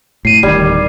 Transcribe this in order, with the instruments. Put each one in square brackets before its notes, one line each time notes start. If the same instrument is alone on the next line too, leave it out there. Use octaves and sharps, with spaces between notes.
[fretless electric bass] A2 [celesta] C7 D#7
[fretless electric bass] D1 D#3 [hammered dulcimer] G3 [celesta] G#6 C7